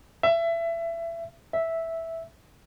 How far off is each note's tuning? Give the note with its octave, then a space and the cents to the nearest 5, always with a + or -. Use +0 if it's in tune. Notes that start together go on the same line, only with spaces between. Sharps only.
E5 +25
E5 -5